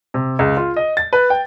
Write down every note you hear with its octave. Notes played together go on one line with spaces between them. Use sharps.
C3
C#2
F4
D#5
A6
B4
G5